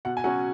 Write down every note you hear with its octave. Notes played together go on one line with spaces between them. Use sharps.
B2 F#5
G#5
F#3 C#4 F#5